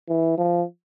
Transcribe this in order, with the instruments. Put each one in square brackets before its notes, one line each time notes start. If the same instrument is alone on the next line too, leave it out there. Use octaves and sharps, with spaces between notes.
[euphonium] E3
F3